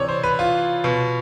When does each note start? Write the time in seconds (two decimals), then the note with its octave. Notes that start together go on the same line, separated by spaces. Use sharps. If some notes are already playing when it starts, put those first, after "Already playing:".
Already playing: C3 E3 C#5 D5
0.08 C5
0.23 B4
0.39 F4
0.84 B2